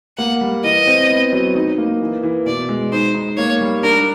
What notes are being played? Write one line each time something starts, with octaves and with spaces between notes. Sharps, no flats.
A#3 F#5
G3
E3 D#5
C4
B3
F#3
D#4
A#3
E3
E3
B2 D5
G#3
D#4 C5
D#4
A#3 C#5
G3
D4 A#4